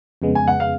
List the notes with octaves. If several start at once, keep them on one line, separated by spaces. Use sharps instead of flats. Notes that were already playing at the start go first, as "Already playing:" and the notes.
F2 C#3 G#3 B3
G#5
F#5
F5